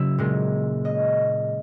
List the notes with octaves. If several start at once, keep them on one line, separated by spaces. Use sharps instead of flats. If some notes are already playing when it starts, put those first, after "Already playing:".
Already playing: C#3 F#3 E5
A#2 G#3
D#5